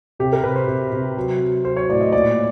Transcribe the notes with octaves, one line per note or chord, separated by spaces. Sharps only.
C3 G4
A#4
C3 B4
C5
C3
C3
F#3
F#3
F#3 C5
C#5
A2 D5
D#5
A#2 D5